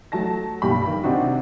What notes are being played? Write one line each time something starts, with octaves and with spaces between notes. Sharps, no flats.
F#3 A3 A5 A#6
B1 G2 G4 B5
D#3
C3 C4 D4 D#4 F#4